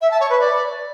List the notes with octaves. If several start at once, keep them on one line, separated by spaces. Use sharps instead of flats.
E5
A5
C#5
B4
D5